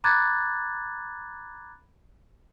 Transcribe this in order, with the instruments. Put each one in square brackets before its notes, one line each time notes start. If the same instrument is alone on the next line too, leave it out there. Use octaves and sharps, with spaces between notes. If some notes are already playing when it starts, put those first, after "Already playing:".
[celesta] A#5 B5 D6 F#6 G#6 A6